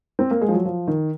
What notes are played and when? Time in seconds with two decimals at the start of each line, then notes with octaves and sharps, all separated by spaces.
0.19 C4
0.31 A#3
0.41 G#3
0.48 F3
0.54 F#3
0.65 F3
0.87 D#3